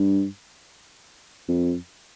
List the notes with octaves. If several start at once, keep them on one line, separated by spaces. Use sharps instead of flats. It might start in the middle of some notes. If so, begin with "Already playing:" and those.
Already playing: G2
F2